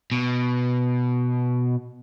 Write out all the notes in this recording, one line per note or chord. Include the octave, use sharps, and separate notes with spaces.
B2